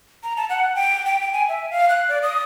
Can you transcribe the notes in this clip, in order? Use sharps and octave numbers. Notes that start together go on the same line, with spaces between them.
A#5
A5
F#5
G5
G5
G5
G#5
E5
F5
F#6
D5
D#6